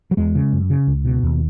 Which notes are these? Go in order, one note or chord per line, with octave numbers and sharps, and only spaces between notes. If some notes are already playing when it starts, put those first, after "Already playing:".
F#3
E2 G#3
C#3
F#2
C#3
C#2
B2
D#2